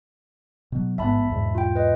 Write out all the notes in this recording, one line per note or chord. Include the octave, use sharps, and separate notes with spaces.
B2 F#3
A1 G#2 B3 E5 A5 B5
E2 G#2 B2
F4 G5
B4 D#5